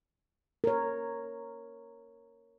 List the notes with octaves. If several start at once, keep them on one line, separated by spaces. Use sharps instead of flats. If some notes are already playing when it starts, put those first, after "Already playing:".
A#4 C#5